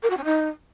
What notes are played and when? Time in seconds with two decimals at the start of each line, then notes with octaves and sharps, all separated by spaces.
0.03 A#4
0.10 F#4
0.17 C#4
0.24 D#4